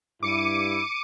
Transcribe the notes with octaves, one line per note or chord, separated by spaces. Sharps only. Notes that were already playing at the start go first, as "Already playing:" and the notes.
G2 E4 D6 C#7 D#7